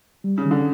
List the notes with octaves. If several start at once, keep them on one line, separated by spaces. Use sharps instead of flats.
G3
C#3
D#3
D3